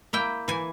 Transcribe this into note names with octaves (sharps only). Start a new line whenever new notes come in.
A#3 E4 G5
E3 G#5